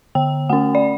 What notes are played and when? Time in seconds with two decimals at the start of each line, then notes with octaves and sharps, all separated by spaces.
0.15 D3 G5
0.49 A3 C#4 F#5
0.75 D5